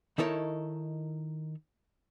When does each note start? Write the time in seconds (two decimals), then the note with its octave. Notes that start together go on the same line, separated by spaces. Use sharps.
0.18 D#3 D#4 E4 A4 A#4 C#5